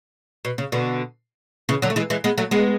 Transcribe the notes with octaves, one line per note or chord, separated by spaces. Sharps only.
B2
C#3
B2 D3
C#3 E3
D3 F#3
A3
E3 G#3
E3 G#3
G#3 B3
F#3 A3
G#3 B3